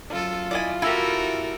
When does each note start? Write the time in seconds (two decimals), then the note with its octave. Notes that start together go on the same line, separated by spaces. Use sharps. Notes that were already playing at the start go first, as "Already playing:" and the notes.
0.10 F#2 F4 A4
0.51 E4 D5 D#5 G#5
0.82 E4 F#4 G4 A4 A#4